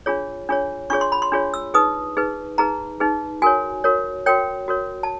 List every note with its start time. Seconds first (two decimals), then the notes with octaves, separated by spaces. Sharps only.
0.06 D4 F4 G#4 C#5
0.49 D4 F4 G#4 C#5
0.90 D4 F4 G#4 C#5 C#6
1.01 C6
1.12 B5
1.22 C6
1.32 D4 F4 G#4 C#5
1.54 E6
1.74 D#4 G#4 B4 D#6
2.17 D#4 G#4 B4
2.58 D#4 G#4 B4 A#5
3.00 D#4 G#4 B4
3.42 F#4 A#4 C#5 G#5
3.84 F#4 A#4 C#5
4.26 F#4 A#4 C#5 G5
4.68 F#4 A#4 C#5
5.03 A5